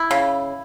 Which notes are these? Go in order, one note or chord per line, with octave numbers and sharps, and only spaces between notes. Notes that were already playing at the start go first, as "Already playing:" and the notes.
Already playing: E4
C#3